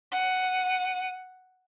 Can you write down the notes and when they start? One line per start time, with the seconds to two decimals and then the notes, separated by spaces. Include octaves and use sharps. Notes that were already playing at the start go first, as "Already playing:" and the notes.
0.12 F#5 D#7